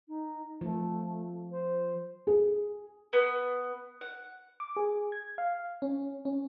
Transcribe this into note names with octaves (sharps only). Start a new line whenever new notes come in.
D#4
F3 A3
C5
G#4
B3
F#5
D6
G#4
G#6
F5
C#4
C#4